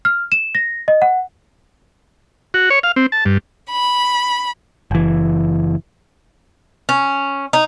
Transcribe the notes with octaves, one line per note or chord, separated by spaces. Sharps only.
F6
E7
A#6
D#5
F#5
F#4
C#5
F5
C4
A5
G2
B5
F#1 E3
C#4
D#4